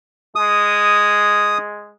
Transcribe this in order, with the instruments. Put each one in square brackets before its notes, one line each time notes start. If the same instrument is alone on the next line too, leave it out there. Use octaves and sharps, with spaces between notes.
[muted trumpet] G#3 [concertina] D#6